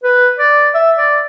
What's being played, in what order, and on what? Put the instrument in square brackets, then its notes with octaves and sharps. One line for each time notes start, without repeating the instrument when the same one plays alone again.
[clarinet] B4
D5
E5
D5